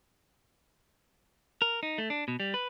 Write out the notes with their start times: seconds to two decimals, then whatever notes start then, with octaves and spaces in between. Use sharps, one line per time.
1.62 A#4
1.83 D#4
1.98 A3
2.10 D4
2.28 B2
2.40 G3
2.54 B4